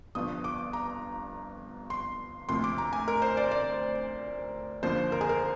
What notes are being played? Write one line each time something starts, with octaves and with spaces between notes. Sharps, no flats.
G1 G2 F3 D#6
D6
A#5
C6
D2 C3 F3 A#3 C6
D6
A#5
G#5
A#4
C5
D5
D5
D#2 D3 F3 A#3 C5
A#4
G#4
A#4